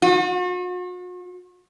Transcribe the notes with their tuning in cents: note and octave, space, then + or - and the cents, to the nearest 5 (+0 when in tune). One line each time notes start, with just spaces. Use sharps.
F#4 -45